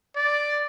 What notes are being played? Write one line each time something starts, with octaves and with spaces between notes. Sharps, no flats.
D5